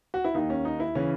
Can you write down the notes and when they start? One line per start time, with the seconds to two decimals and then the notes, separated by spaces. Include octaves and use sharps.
0.14 F#4
0.24 E4
0.34 D#2 D#3 D#4
0.50 C#4
0.65 D#4
0.80 E4
0.95 C#3 E3 C#4